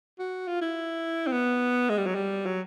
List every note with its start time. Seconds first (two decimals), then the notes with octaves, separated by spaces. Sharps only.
0.19 F#4
0.47 F4
0.61 E4
1.27 C4
1.32 B3
1.89 G#3
1.98 G3
2.06 F#3
2.15 G3
2.46 F#3